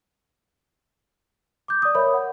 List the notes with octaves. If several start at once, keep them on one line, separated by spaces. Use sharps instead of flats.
D6 G6
D5 D#6
A#4 C#5 E5 B5
F#5